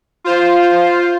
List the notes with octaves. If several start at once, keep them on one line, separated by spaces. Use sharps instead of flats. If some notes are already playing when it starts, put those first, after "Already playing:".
F4 C5